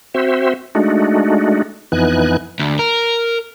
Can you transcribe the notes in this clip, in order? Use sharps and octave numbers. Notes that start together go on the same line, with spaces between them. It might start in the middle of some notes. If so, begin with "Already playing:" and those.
C4 F#4 C5 E5
G#3 A3 D4 D#4 F#4
F2 E3 B3 D#4 G#5 F#6
D2
A#4